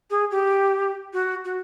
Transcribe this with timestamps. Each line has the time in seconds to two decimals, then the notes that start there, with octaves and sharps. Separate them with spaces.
0.10 G#4
0.31 G4
1.13 F#4
1.45 F#4